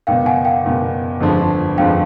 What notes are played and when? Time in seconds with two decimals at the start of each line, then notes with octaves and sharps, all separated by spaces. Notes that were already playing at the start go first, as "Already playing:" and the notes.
0.07 F#1 E2 B2 F5 G5
0.26 F#5 G#5
0.45 F5 G5
0.64 F#1 E2 B2
1.20 G1 F2 D3 F3 G#3
1.78 G1 F2 D3 F3 G#3 F5 G5